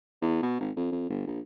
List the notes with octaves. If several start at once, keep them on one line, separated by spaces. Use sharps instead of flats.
E2
B2
G#1
F2
F2
G1
A#1